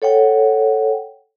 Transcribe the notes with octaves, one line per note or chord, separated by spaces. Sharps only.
A4 C#5 F#5 G5